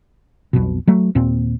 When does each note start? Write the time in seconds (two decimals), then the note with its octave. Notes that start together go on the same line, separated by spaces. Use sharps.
0.53 B1 F2 B2
0.87 F#3 A3
1.15 D#2 A#2 C4